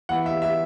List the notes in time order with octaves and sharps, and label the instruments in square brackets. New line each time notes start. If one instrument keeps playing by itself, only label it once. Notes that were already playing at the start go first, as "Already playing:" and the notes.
[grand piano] E3 B3 E4 B4 [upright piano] F#5
[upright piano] E5
E5